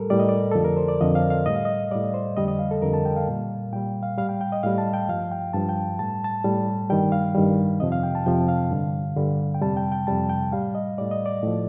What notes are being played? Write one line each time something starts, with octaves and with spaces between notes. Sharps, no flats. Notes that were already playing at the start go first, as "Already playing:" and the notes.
Already playing: A2 G3 A4 A#4
A2 G3 D5
D#5
D5
F2 D3 F3 A4
A#4
C5
D5
F2 D3 F3 D#5
F5
F5
A2 G3 D#5
F5
D#5
A2 G3 D5
C5
F2 D3 G3 D#5
D#5
F5
A4
F2 D3 G3 A#4
A5
G5
F5
A#2 G3
A#2 G3 G5
F5
A2 G3 F5
G5
G5
D#5
A2 G3 F5
A5
G5
G2 F3 F5
G5
G2 F3 A5
G5
A2 G3 A5
A5
A2 G3
G2 D#3 G3 G5
F5
G2 D#3 G3
F2 C3 F3 D#5
F5
G5
A5
F2 C3 F3 G5
F5
G2 D3 G3
G2 D3 G3
G5
F2 C3 G3 A5
G5
G5
F2 C3 G3 A5
G5
A2 G3 F5
D#5
A2 G3 D5
D#5
D5
A2 F3